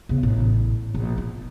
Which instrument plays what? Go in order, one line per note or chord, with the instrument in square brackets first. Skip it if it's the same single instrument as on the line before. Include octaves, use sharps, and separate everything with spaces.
[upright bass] C#3 B3
A1 A2
A#1
F4